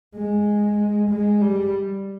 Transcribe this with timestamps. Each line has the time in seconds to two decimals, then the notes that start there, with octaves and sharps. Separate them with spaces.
0.15 G#3
1.10 G#3
1.41 G3